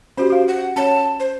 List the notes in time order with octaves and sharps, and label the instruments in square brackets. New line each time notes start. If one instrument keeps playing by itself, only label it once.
[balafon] C#4 F#4 G4 [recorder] C5
[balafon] F#4 F5
[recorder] F#5
[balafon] C#4 C#5 F#5 [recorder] A5
[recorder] C5